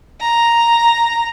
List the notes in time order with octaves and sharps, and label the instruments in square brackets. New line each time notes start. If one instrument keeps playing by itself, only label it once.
[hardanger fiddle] A#5